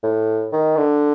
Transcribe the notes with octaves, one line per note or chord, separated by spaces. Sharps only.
A2
D#3
D3